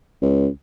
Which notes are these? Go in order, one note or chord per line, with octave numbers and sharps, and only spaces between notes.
C#2